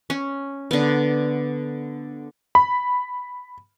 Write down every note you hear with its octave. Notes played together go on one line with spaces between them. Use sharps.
C#4
D3 B3
B5